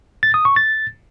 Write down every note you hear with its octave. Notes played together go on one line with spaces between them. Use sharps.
A6
D#6
C#6
A6